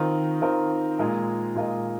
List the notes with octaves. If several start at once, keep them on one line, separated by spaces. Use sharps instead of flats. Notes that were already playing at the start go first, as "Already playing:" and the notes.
Already playing: D#3 C4 F4 A#4
D#3 C4 F4 A#4
A#2 G#3 F4 A#4 D#5
A#2 G#3 F4 A#4 D#5